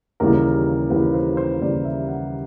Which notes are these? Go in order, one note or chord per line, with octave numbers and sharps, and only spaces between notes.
D#2 C#3 E3 G3 A#3 A#4
D#2 C#3 E3 G3 A#3 B4
C5
C5
D#2 C#3 E3 G3 A#3 D5
E5
F#5